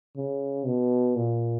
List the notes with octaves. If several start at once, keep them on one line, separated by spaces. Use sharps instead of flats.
C#3
B2
A#2